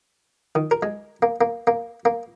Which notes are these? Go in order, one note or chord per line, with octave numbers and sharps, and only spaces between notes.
D#3
A#4
G#3
A#3
A#3
A#3
A#3